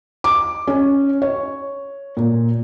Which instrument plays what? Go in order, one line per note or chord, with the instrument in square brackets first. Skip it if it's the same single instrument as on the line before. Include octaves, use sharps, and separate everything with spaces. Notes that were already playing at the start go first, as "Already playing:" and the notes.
[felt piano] D6
C#4
C#5
A#2